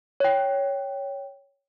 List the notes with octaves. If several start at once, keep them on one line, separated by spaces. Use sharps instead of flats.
C#5 G5